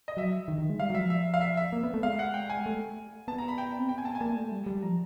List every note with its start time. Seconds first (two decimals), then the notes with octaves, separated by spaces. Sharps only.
0.08 D#5
0.17 F#3 E5
0.48 D#3
0.58 D#3
0.70 G#3
0.80 G3 F5
0.90 F#3
0.95 E5
1.00 F3
1.10 E5
1.34 F5
1.41 E5
1.57 E5
1.73 A#3
1.83 B3
1.94 A3
2.03 G#3 F5
2.19 F#5
2.34 G5
2.50 G#5
2.66 A3
3.28 B3 A5
3.38 A#5
3.48 B5
3.58 G5
3.79 C4
3.89 B3 G5
3.98 G#5
4.05 A5
4.15 G#5
4.21 A#3 A5
4.36 A3
4.52 G3
4.66 G3
4.82 F3 A#5